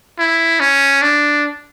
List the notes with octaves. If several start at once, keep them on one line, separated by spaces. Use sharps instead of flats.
E4
C#4
D4